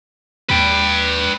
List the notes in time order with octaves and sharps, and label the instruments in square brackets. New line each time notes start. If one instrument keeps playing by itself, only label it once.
[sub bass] D#2 [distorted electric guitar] B4 G5